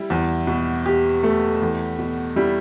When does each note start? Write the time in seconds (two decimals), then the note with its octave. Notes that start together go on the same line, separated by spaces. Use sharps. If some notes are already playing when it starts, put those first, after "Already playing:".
Already playing: G3 E4
0.10 E2
0.47 B2
0.86 G4
1.23 A3
1.62 E2
1.99 B2
2.36 G3 E4